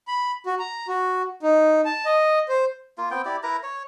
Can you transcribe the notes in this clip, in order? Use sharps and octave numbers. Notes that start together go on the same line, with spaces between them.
B5
F#4
A#5
F#4
D#4
A5
D#5
C5
A#3 F4
B3 C4 G5
E4 G4 D5
E4 A#4 B4 A#5
C#5